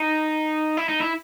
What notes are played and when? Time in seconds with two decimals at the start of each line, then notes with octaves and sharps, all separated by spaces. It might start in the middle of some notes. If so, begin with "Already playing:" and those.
Already playing: D#4
0.77 E4
0.89 D#4
1.00 E4